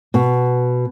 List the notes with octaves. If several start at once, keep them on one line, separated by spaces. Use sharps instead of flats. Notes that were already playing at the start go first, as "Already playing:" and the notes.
B2